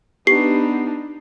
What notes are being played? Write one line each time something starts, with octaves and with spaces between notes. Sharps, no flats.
B3 D4 D#4 G4 C7